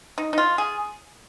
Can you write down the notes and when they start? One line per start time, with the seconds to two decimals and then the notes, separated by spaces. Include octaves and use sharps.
0.18 D#4
0.33 D#4
0.38 F4
0.58 G#4